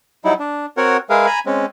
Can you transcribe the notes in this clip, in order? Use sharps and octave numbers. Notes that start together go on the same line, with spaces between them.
F#3 G3 D#4 E4
D4
C4 F#4 A#4 C#5 F#5
G#3 G#4 A#4 B4 E5 F5
G#5 A#5 B5
G#3 C4 C#4